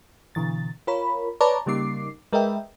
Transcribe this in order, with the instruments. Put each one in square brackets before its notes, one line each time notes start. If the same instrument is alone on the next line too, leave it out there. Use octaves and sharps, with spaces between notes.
[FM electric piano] B2 D3 E3 A6
F4 A#4 C#5 B5
B4 C#5 D5 A5 A#5 D6
C#3 G3 A#3 D#4 D6 C7
G#3 A#4 B4 D#5 E5 G5